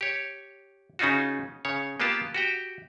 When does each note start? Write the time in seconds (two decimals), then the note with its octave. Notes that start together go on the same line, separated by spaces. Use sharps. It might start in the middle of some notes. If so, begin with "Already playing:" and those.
0.01 G4 C#5
0.99 C#3 C#4 D#4 F4 F#4
1.65 C#3 C#5
2.00 A#3 B3 F4 G4 A5
2.34 F#4 G4 G5